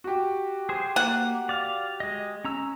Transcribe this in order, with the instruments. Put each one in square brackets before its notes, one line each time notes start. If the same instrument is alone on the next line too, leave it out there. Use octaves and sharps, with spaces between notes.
[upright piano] F#4 G4
[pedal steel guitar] G#4 C5
[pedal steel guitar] A#3 [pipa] F#5
[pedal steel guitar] D5 F5
G#3 D#5
C#4 A#5 E6